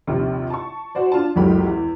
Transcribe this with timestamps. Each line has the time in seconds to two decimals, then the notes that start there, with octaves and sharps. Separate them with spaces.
0.07 A#1 D#2 C3
0.50 A5 C#6
0.95 F#4 C5 D5
1.12 D4 F4 A5
1.35 F#1 C#2 A2 F#3 G4 B5
1.67 E2